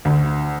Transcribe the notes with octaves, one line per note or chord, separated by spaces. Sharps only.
D2